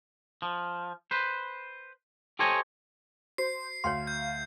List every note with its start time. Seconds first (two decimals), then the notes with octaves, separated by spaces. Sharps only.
0.42 F3
1.11 B4 C5
2.39 G4 A4 C5 C#5 D#5 G#5
3.38 F#4 C5 C7
3.84 D2 C#5 F5 G5 C6
4.07 G6